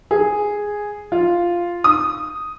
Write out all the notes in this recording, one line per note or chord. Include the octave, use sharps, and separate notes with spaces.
G#4
F4
D#6